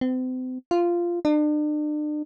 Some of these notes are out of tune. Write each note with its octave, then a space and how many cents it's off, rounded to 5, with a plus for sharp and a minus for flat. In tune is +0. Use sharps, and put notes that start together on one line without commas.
C4 -40
F4 -10
D4 +40